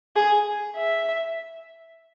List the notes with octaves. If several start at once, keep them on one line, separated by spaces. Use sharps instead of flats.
G#4
E5